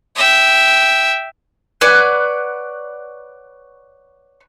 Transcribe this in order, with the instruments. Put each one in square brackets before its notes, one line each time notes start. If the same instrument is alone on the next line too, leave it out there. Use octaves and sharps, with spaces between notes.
[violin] E5 G5
[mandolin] B4 C#5 D5 F#5